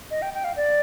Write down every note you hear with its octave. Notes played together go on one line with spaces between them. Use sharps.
D#5
G5
G5
F5
D5